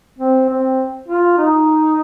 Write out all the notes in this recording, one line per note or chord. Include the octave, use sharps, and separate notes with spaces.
C4
C4
F4
D#4